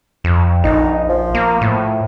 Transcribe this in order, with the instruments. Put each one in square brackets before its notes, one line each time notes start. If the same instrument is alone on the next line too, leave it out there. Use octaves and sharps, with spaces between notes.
[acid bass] F2
[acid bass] A#1 [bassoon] D#4
[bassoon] F3
[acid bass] A#3
A2